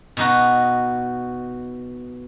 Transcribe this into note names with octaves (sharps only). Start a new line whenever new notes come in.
B2 D#4 F#4